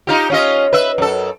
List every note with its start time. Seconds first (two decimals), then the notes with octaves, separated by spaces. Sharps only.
0.07 D#4 F4 G4
0.30 C#4 F4 D#5
0.73 B4 E5
0.98 F#2 A4